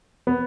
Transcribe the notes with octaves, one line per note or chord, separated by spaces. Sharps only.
B3